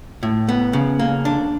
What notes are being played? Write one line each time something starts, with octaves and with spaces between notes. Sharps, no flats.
A2
B3
C#3
A#3
D4